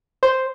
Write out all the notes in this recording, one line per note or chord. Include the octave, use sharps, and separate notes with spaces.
C5